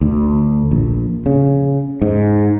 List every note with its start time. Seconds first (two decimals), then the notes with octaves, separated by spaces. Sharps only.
0.01 D2
0.71 A#1
1.26 C#3
2.02 G#2